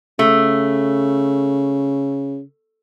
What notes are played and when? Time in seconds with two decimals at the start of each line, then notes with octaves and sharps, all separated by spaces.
0.19 C#3 A3